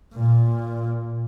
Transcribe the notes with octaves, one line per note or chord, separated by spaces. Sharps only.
A#2